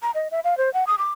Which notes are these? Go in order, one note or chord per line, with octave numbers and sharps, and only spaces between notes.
A#5
D#5
E5
F5
C5
F#5
D#6
D6